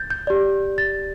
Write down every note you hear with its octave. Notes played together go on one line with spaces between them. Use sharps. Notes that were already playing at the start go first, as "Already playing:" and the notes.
Already playing: G6 A6
G6
G4 D5
A6